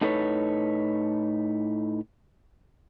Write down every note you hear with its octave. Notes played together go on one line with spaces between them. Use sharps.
A2 D#4 A4 B4 C#5